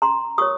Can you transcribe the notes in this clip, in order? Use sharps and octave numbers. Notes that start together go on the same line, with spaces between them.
C#4 A#5 C6
F#4 A#4 C#5 C#6 D#6